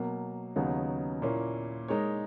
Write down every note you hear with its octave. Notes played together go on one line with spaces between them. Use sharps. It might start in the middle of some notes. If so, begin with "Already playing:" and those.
Already playing: B2 F#3 A#3
D#2 C#3 F#3 B3 D#4
A#2 A#3 C#4 E4
G#3 D#4 A#4 C#5